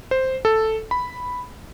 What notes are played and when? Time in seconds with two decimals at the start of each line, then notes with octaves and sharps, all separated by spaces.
0.11 C5
0.45 A4
0.91 B5